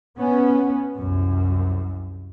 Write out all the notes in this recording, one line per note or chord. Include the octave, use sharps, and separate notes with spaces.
B3 C#4
C2 F#2